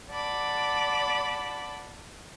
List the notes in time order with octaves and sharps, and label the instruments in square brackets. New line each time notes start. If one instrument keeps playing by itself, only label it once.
[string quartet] D5 F#5 A5 B5 D6